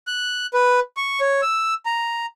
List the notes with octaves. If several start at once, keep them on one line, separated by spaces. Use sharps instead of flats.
F#6
B4
C#6
C#5
E6
A#5